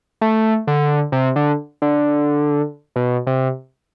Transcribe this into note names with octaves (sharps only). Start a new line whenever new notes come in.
A3
D3
C3
D3
D3
B2
C3